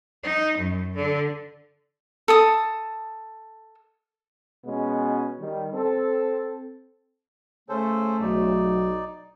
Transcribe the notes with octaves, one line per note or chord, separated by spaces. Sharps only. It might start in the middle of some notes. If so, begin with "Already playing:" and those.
D#4
F#2
D3
A4 A5 D#6
B2 G#3 B3 C#4
D#3 G3
C4 A4
C#3 A3 C#4 A4 C5
B1 F#3 D#4 D5